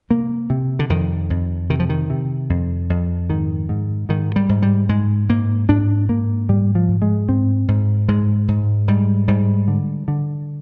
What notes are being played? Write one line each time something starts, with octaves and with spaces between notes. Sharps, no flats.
C3 A#3
C3
D3
F2 D#3
F2
C3 D#3
F3
D#3
C3
F2
F2
G#2 D#3
G#2
G#2 D#3
G3
G#2
G3
G#2 G#3
G#2 A#3
G#2 D4
G#2 A#3
G#2 G3
F3
G#2
G#3
G#2 C4
G#2
G#2 G#3
G#2
G#2 G3
G#2 G3
D3
D3